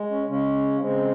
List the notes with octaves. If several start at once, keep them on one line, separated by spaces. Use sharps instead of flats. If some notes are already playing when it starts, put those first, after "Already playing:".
Already playing: G#3
C#4
C#3 G#3 C#4
C#3 G#3 C4